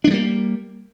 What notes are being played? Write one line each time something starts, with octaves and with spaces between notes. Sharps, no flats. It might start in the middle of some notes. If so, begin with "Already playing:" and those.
G3 G#3 A#3 D4